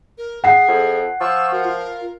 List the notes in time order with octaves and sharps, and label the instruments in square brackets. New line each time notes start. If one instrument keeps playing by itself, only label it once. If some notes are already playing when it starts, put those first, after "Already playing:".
[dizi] A#4
[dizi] G#4 [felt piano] F#5 C7
[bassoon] F2
[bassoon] F3 [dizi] C#6 [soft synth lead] E6
[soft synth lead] F#4 [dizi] A#4
[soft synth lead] F4